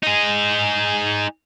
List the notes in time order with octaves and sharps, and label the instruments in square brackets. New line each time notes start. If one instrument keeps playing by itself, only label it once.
[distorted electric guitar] D#4 G#4